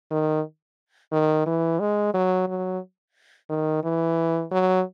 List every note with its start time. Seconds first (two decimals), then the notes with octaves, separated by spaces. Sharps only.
0.11 D#3
1.12 D#3
1.46 E3
1.80 G#3
2.14 F#3
2.48 F#3
3.50 D#3
3.83 E3
4.52 F#3